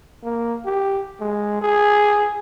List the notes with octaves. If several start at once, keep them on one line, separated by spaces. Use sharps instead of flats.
A#3
G4
G#3
G#4